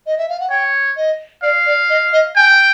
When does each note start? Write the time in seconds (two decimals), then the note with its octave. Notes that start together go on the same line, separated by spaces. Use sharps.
0.06 D#5
0.18 E5
0.29 F5
0.40 F#5
0.49 C#5 G5
0.97 D#5
1.42 D5 F5
1.66 D5
1.90 D#5
2.13 D#5
2.36 G5 G#5